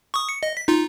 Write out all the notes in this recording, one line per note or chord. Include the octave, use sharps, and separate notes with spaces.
C#6 D#6
C#7
D#5
B6
D#4 F4